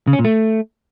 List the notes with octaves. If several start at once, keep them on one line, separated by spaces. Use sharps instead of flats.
C#3
C#4
A#2
A3